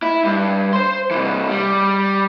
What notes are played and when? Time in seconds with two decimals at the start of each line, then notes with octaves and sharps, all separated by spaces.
0.03 E4
0.25 G2
0.73 C5 C6
1.11 C3 E3
1.50 G3